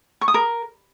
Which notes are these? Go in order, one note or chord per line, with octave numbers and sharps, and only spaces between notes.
C#6
D#6
A#4